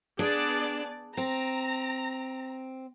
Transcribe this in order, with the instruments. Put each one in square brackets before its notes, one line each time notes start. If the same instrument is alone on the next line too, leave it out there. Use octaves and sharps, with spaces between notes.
[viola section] B3 G#4 D5 [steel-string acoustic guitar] D4
[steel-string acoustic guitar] C4 [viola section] A#5